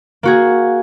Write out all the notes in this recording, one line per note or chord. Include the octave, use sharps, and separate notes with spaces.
A#3 F#4 G#4